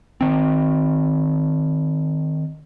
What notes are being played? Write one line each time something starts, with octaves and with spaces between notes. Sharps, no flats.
D#3 C4